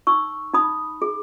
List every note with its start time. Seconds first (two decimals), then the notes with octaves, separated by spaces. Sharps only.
0.07 D#4 C#6 E6
0.54 D#4 B5 D#6
1.02 G#4